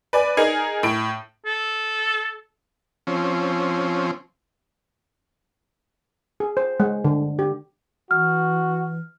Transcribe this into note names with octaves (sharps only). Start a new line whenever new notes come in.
B4 D5 G#5
D#4 G#4 A#4
A2 D7
A4
F3 C4 C#4
G#4
C5
G#3
D3
G4
E3 F#4 F6